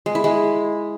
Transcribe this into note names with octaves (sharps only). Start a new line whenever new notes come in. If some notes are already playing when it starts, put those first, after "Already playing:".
G#3
E4
G#3